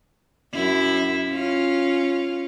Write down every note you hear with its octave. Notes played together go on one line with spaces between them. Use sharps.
F#2 E4
C#4 F4